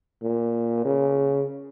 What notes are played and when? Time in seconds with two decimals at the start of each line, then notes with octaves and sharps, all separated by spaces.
0.22 A#2
0.85 C#3